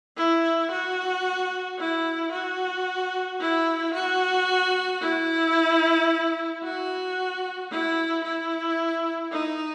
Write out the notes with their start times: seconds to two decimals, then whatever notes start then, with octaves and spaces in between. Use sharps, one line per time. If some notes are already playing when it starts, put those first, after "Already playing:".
0.17 E4
0.71 F#4
1.79 E4
2.32 F#4
3.40 E4
3.94 F#4
5.02 E4
6.63 F#4
7.71 E4
8.24 E4
9.32 D#4